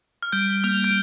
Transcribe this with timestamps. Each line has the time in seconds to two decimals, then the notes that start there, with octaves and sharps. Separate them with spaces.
0.23 F6
0.32 G3 G6
0.64 A#3 F6
0.84 G6